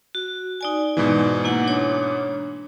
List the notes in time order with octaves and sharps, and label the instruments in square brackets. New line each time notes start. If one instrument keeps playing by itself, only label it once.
[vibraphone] F#4
D#4 D5 G#5
[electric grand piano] G#2 B2 E3
[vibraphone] A#3 E4 F#5
D4 C#5